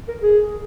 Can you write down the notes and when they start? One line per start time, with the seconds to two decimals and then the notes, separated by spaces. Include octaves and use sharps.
0.08 A#4
0.22 G#4